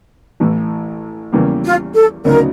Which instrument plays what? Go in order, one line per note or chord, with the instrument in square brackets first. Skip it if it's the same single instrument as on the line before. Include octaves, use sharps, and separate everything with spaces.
[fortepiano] A1 A2 E3
E2 C#3 E3 G3 A#3
[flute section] F4
A4
[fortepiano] D2 C#3 F#3 B3 D#4 [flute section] A#4